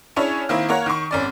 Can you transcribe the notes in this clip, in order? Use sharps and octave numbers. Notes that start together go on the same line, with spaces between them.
C#4 D4 E4 G#4 C#5
D#3 A#3 C4 E4
A#3 A#4 C#5 F#5
D#3 C#6
G#1 C#4 D5